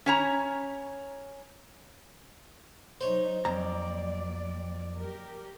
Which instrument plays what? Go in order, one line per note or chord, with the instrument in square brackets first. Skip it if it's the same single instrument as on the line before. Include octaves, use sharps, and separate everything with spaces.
[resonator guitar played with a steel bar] C#4 C#5 A#5
[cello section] F#3 D#4 [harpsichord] C5 C#5
[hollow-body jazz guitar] F2 A#5 [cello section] F#3 A#3 D5
[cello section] G4 A#4